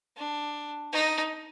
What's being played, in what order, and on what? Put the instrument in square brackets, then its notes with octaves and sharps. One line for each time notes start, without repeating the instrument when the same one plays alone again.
[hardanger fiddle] D4
D#4